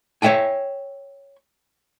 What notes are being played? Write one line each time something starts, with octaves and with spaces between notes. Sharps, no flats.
C#5 D5 E5 G5 G#5